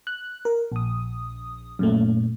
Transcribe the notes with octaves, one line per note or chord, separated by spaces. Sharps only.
F#6
A#4
A#1 D#6
F#2 A#2 A3